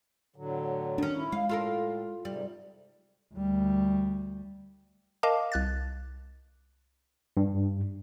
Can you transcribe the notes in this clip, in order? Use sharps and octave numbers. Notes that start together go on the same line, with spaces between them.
A2 D3 F#3
D#3 C#4 D4
E4
G#3 F5
A2 F4 A4 A#4
G#2 C3 G3
D2 G3
A#4 D#5 F5 A5 D6
C2 F#6 A6
G2